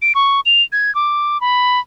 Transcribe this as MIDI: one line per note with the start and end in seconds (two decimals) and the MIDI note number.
0.02 0.13 98
0.15 0.41 85
0.46 0.62 101
0.72 0.93 92
0.95 1.40 86
1.41 1.80 83